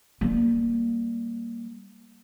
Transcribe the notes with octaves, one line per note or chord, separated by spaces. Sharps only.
G3 A#3